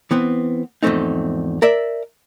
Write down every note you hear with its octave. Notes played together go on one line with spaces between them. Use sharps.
E3 B3 C4
E2 G#2 F3 A3 C4 D#4
A#4 D5 E5